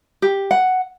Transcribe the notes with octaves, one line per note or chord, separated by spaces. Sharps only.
G4
F#5